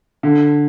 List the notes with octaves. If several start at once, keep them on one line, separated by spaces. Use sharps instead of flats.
D3